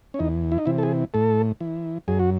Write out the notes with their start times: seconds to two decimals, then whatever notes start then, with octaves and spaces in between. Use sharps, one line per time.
0.14 C#4
0.19 E2 D#4
0.52 E4
0.58 D#4
0.66 C3 E3 E4
0.78 A4
0.83 G#4
1.14 A2 A4
1.61 E3
2.08 F#2 G#4
2.19 F#4